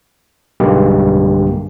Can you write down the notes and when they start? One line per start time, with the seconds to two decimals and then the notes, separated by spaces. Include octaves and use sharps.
0.60 B1 G2 D3 G#3 A#3 G4